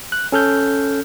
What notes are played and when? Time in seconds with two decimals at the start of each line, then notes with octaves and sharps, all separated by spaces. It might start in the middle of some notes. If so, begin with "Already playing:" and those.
0.12 F#6
0.32 C#4 A4 F6 G6